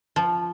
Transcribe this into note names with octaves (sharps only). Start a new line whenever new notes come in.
F3